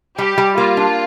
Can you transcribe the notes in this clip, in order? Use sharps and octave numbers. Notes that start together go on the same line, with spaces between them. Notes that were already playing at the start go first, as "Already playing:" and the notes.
G3 G4
G3
A#3 F4
D4